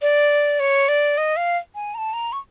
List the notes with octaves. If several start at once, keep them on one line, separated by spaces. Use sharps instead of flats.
D5
C#5
D5
D#5
F5
G#5
A#5
A5
A#5
C#6